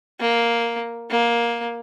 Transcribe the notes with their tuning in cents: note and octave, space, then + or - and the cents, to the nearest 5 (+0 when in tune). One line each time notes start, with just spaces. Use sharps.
A#3 +0
A#3 +10